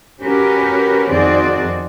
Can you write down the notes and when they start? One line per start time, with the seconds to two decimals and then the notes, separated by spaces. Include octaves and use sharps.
0.23 C#4 F#4 G4 A#4 B4
1.09 F2 D#3 C4 F#4 G#4 D5